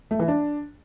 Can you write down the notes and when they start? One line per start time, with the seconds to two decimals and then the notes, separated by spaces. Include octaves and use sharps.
0.11 A3
0.19 E3
0.28 D4